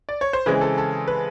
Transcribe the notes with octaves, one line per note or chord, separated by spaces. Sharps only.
D5
C#5
C5
C#3 E3 G#3 C4 B4
A4
A4
B4